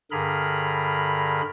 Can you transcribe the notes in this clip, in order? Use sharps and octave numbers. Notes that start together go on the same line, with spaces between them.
G2 D3 G#4 A#4 B5 F6